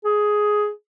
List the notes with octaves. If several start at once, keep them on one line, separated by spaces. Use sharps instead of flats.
G#4